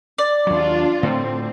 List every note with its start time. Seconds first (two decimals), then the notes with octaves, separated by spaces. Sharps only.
0.18 D5
0.47 D#2 F#3 D4 F4
1.03 A2 D3 A3 C4